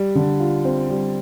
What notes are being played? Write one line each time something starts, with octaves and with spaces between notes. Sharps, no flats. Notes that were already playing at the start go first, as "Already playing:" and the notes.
Already playing: G3
D3
F4
C4
G3